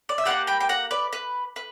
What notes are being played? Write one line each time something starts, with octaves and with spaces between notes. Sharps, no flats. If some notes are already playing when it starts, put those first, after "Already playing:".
D5
E5
A#3 E4 G4 D5 F#5
G5 B5
G5
F#5 A#5
B4 D5
B4
B4